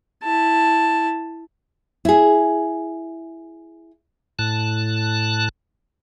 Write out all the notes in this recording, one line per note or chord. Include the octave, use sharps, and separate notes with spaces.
E4 A5
E4 G#4
A2 A5 F#6